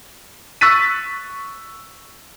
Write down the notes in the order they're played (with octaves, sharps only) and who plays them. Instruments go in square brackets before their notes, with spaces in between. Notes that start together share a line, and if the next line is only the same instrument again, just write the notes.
[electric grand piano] C#6 E6 F#6 A6 B6 D#7